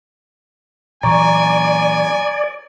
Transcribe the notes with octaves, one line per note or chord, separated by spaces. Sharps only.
A#2 E3 F#3 D5 G#5 A#5 C#6